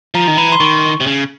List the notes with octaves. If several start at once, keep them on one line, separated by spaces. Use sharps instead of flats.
F3 A#5
D#3
E3 B5
C6
D#3 C#6
C3
C#3